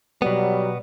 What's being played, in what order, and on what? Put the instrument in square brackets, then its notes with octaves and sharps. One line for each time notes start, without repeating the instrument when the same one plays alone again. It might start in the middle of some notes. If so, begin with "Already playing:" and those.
[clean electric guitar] B2 B3 [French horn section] F#3 [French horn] G3